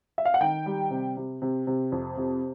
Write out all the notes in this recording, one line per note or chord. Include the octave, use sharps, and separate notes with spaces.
E5
F5
F#5
D#3 G5
G3
C3
C3
C3
C3
F2
C3